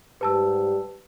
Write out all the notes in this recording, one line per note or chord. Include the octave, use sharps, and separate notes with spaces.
G#2 G3 G4 B4 A5 E6